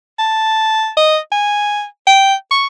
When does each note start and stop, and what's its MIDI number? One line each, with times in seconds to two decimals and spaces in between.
0.19 0.90 81
0.97 1.18 75
1.32 1.85 80
2.07 2.34 79
2.51 2.67 85